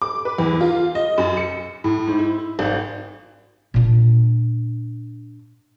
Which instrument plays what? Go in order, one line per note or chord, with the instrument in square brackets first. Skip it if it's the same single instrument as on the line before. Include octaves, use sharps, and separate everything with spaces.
[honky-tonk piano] D6
B4
E2
F4
D#5
F#2
C#7
A2
G#2
E4
G#1
[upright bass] A#2 D4